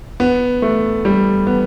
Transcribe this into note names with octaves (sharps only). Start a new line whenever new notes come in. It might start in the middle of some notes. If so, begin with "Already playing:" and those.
B3
A3
G3
B3